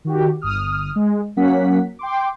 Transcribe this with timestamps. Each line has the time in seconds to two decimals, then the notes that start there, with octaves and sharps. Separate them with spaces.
0.05 D#3 F#4 G4
0.42 G1 D#6 F6
0.96 G#3
1.36 F#3 A#3 C#4 F#5 B6
1.99 G5 C6 D6